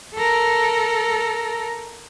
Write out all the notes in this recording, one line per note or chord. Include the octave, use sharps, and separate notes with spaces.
A4 A#4